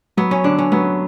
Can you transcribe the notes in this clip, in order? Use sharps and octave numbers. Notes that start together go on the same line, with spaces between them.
F#3 B3
C#4
D3 D4
C#4
F#3 B3